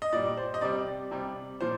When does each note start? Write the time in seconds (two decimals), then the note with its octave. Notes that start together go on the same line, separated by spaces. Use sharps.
0.02 D#5
0.13 A#2 G3 D5
0.37 C5
0.54 D#5
0.61 C3 G3 D5
1.11 C3 G3
1.61 A#2 F3 C5